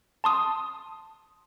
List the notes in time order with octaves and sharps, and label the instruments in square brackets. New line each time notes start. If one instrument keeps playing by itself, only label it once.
[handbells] A5 C6 D#6